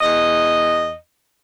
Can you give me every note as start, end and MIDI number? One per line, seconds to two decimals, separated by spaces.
0.01 0.94 40
0.01 0.94 75